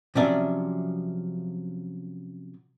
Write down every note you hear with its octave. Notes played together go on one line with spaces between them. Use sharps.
C3 F3 F#3 C#4 D5 E5